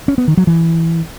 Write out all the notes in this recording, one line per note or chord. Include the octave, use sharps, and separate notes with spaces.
C#4
B3
D#3
F#3
E3